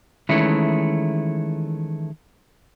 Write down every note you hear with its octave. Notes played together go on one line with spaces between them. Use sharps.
D#3 E3 G#3 A3 C#4 E4